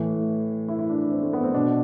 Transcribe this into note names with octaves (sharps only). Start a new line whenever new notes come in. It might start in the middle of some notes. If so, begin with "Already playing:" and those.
Already playing: A2 E3
E4
E4
D4
D4
C4
A3
B3
C4
B2 D4